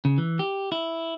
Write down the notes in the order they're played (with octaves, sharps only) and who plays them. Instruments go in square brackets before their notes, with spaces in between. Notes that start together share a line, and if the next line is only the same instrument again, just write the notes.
[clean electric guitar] C#3
E3
G4
E4